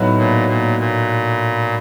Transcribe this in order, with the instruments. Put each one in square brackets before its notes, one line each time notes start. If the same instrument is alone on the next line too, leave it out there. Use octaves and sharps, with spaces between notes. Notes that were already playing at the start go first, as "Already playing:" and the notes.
Already playing: [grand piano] A2 F#3 B3 D#4 F#4
[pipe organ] A#2
A#2
A#2